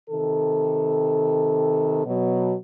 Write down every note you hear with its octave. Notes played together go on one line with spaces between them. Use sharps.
C3 D#3 A4
B2 F#3